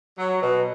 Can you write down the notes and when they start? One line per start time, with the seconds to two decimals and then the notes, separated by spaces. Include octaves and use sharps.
0.18 F#3
0.41 B2